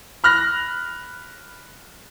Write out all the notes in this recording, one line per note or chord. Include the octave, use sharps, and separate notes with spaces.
B5 F6 F#6 A#6